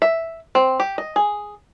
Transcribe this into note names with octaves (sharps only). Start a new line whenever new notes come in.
E5
C4
G4
D#5
G#4